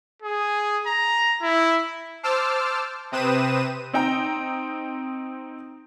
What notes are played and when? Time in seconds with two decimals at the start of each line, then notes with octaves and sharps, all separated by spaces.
0.22 G#4
0.87 A#5
1.42 E4
2.23 C5 A5 D6 E6 F6
3.12 C3 C4 B4 D#6 D#7 E7
3.93 C4 D#4 G5 A#5